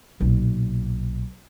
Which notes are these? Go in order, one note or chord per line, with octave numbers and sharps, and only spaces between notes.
B1 A#2